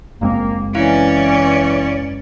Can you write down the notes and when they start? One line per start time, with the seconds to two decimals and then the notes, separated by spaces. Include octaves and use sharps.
0.21 F#1 G#3 A#3 C4
0.75 E3 C#4 E4 D5 F5